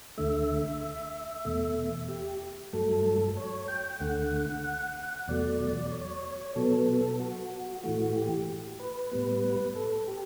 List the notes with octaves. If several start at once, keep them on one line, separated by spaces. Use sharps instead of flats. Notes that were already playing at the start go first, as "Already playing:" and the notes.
D2 D3 A3 E5
E2 B2 A3
G4
G2 F#3 A3 A4
C#5
G5
D2 D3 A3 F#5
E2 B2 F#3 A3 D5
C#5
C#5
B2 F#3 B3 A4
F#4
A2 E3 A3 F#4
G4
B4
A2 G3 B3
A4
G4